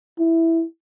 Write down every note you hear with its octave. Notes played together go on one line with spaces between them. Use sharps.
E4